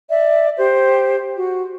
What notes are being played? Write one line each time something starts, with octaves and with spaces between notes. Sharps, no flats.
D5 E5
G4 C5
F#4